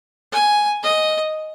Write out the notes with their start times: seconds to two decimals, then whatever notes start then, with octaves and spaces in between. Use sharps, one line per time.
0.32 G#5
0.83 D#5